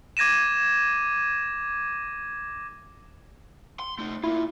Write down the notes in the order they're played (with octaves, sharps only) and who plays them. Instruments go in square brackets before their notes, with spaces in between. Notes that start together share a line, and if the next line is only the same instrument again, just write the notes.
[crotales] D6 G#6 A#6 D#7 E7
[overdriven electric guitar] C6
A3 D#4
[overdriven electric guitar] A#3 F4 [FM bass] E4